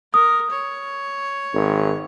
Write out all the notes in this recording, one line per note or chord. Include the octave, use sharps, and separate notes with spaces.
A#4 D#6
C#5
G#1